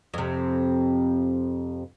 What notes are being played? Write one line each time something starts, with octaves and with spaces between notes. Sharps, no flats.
F2 C3